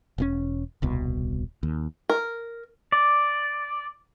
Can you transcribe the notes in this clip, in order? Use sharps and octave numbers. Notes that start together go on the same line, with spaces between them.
E1 A2 C#4
D#1 C2 B2
D#2
A#4
D5